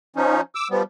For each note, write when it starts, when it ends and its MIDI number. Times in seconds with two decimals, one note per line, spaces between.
0.16 0.41 53
0.16 0.41 61
0.16 0.41 63
0.55 0.68 86
0.55 0.68 88
0.71 0.83 53
0.71 0.83 55
0.71 0.83 59